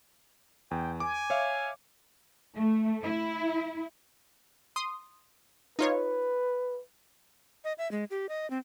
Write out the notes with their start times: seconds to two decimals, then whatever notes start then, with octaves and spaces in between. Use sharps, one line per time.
0.71 E2 G5
1.00 G#5 D6
1.30 C#5 E5 F5
2.55 A3
3.03 E4
4.76 C6 D#6
5.79 D#4 F4 B4 C#5
7.64 D#5
7.78 E5
7.92 G#3
8.10 G4
8.29 D#5
8.50 C4